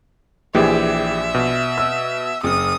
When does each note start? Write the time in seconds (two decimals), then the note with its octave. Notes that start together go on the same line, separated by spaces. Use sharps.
0.55 A#1 E3 G4 G#4 E5
1.34 B2
1.78 E6
2.43 F#1 D#6